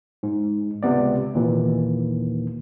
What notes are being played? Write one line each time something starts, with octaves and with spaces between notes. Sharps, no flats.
G#2
C#2 C3 B3 D5
D#2 A#2 E3